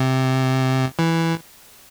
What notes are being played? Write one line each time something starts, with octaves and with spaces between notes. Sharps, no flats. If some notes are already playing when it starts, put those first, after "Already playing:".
Already playing: C3
E3